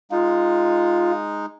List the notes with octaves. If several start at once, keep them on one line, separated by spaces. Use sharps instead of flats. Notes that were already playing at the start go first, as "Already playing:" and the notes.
G#3 D#4 F4